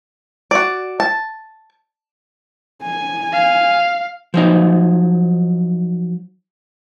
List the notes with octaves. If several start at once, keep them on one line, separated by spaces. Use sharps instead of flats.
F#4 D5
A5
G#5
F5
F3 F#3 D#4